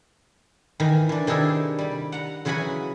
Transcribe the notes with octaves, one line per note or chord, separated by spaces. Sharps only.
D#3 E3
E3 D4
C3 D#3 D4 E4 G#4 A4
G3 B5
F#5 A#5
C#3 E3 F#3 F#5 G#5 B5